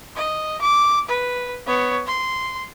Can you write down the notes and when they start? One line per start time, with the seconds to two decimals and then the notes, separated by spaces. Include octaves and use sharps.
0.16 D#5
0.62 D6
1.09 B4
1.67 B3 C#5
2.07 C6